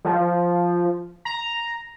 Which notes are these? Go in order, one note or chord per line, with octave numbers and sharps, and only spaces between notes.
F3
A#5